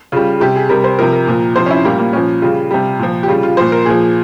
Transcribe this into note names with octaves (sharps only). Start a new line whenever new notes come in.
C#3 G3 F4
C3 G3 G4
G#4
C3 G3 A#4
C5
C3 F3 A#4
A#4
A#2 F3
C3 F3 C5
C#4
E4
A#2 G3 A#3
A#3
A#2 F3 C#4
C#3 G3 F4
C3 G3
A#2 F3
G4
C#3 G3 F4
F4
A#2 F3 C5
A#4
A#2 F3 G#4